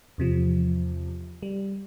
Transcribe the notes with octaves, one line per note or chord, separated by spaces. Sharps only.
E2 C3 F3
G3